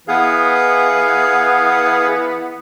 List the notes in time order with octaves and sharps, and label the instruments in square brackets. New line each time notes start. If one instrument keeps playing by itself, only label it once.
[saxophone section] E3 B3 [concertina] G#4 F5